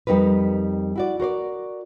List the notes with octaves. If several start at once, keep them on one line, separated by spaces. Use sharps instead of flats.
F2 G3 D#4 A#4 B4
E4 F#4 D5
F#4 A#4 C5 D5